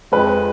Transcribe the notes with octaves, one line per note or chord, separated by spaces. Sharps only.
F2 F3 G#3 B4